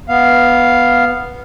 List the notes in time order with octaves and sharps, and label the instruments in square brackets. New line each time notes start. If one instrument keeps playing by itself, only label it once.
[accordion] B3 F5